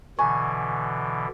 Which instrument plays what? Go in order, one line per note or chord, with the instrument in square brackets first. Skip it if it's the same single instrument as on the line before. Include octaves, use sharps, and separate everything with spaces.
[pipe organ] B2 D3 E3 [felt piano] G#5 [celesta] C#6